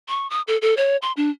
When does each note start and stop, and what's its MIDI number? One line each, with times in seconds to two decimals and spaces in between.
0.08 0.29 85
0.30 0.41 87
0.47 0.57 69
0.62 0.74 69
0.77 0.97 73
1.02 1.12 84
1.17 1.30 62